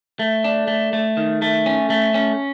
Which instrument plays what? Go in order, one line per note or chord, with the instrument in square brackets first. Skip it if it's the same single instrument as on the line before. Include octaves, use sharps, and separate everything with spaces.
[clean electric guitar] A3
D4
A3
A3
D#3
A3
C#4
A3
C#4